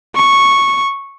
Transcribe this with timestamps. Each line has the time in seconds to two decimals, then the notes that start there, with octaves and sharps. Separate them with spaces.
0.15 C#6